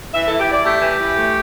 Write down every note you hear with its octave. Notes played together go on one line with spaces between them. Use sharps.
E3 E5
E4 A4
G4
E4 D5
A3 G4
E3
E3
A3